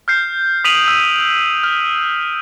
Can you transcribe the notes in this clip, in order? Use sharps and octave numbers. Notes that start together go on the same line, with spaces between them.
F6 G6 C7
D#6 B6 D7 D#7 F7 F#7
E6
F6